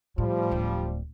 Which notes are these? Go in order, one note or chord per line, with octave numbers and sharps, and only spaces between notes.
A2 F3 G3
D1